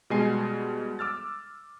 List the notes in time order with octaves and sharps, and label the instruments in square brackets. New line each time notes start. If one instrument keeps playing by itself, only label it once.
[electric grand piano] B2 G3 G#3 D#5 G#5 C7
D6 E6 F6 A6